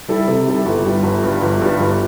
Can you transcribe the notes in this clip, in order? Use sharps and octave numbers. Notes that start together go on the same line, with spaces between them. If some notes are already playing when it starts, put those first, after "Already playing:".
G3 E4 A4
C3
G3 E4 A4
G1
G2 G3
G1
G2 G3
G1
G2 G3
G1